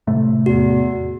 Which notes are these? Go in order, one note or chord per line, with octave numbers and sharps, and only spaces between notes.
A2 C3 A3
E2 F#4